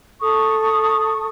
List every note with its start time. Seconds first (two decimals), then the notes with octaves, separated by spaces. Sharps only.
0.21 A4 C#6 D#6